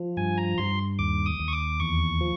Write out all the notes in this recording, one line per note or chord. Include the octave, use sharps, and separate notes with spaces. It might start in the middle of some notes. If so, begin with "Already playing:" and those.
Already playing: F3
G2 G#5
A#5
G2 C6
D#2 D6
D#6
D#2
C#6
D6
E2 C#6
F3